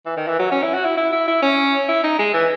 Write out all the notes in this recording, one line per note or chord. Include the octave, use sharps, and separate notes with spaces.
E3
D#3
E3
F#3
C#4
E4
F#4
E4
E4
E4
E4
C#4
E4
D#4
G#3
E3